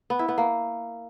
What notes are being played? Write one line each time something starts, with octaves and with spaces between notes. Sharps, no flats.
B3
E4
B3
A#3